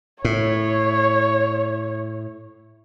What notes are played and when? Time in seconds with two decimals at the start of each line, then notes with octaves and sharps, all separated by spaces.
0.25 A2 C#5